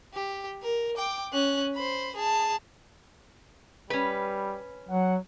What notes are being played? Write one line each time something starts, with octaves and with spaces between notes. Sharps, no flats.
G4
A#4
G5 D6
C#4 F#6
C5 B5
G#4 A5
G3 C#4 B4
F#3 F#5